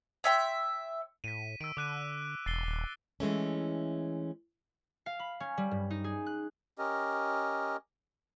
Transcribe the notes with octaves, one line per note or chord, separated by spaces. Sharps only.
C#5 E5 G5 C6
A2 B6 D#7
D#3 E6 D7
D3 D6 F#6 D#7
E1 A6 C7 G7
D#1
E3 G#3 A3 C#4
F5
B5
C#4
G3
G2
D#4
G#4
F#6
C#4 G4 A#4 D#5